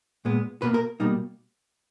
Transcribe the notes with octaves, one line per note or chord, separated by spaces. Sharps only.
A#2 G#3 B3
B2 A#3 B4
A#4
B2 G3 A#3 D#4